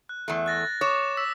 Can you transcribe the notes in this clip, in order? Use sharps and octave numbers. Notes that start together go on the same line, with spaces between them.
F#6
E2 A3
F#6 A6 A#6
C#5 D6 D#6 E7
E6 B6